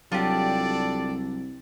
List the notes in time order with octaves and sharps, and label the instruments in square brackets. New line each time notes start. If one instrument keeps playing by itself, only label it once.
[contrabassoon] C2 [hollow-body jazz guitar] F#3 [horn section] D4 A4 D5 [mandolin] F4 G4